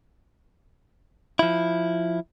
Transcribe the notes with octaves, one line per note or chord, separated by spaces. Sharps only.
F3 E4